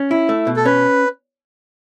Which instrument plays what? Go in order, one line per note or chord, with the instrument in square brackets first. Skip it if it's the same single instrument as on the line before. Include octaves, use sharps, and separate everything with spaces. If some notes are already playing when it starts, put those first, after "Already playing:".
Already playing: [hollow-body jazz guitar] C#4
E4
A3
B2
[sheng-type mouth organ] A4
[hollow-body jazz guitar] C#4 [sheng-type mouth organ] B4